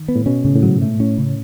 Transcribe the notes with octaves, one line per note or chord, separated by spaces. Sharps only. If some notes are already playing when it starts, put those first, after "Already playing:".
Already playing: D#3
B3
A2
B2 C#4
A2 C#3
A2
G#2 F#3
A3
A2 C#4
C#3